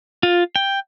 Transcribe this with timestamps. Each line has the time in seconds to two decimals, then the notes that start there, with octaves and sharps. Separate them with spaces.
0.23 F4
0.56 G5